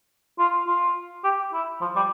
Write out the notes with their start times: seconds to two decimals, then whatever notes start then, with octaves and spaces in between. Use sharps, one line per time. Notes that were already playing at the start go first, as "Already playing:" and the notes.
0.39 F4
0.67 F4
1.24 G4
1.53 E4
1.81 F3
1.96 G3